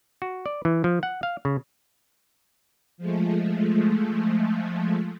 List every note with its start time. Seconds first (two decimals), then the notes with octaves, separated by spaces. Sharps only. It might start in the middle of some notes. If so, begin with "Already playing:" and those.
0.22 F#4
0.46 D5
0.65 E3
0.84 F3
1.03 F#5
1.23 F5
1.45 C#3
2.98 F3 G#3 A3